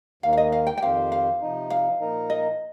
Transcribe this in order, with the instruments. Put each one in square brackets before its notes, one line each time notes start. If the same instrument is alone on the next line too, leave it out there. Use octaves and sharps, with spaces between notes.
[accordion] D#2 D#3 A#3 [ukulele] F5
[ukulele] F5
D#5
F5
G5
G5
[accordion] F2 D#3 C4 G4 C5 [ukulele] F5
[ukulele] F5
[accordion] C3 F3 D#4
[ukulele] F5
[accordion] A#2 F3 D#4 A#4
[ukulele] D#5